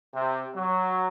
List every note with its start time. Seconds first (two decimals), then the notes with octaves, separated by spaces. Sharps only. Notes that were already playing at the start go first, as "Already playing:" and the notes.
0.14 C3
0.55 F#3